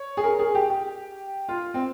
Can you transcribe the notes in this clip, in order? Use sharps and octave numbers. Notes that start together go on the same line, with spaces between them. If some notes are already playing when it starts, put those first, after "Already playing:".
Already playing: C#5
G#4
A#4
G#4
G4
G4
F4
C4